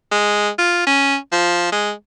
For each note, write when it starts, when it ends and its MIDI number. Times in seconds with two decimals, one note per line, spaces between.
0.11 0.49 56
0.58 0.82 65
0.87 1.16 61
1.32 1.69 53
1.72 1.91 56